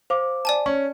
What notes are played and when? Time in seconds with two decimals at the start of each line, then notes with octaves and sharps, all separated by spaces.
0.10 C5 F5 D6
0.45 D5 G#5 A5
0.66 C#4 C#6